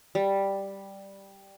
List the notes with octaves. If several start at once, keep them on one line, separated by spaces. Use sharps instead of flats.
G3